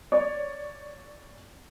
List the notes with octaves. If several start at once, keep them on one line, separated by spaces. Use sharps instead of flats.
C#5 D5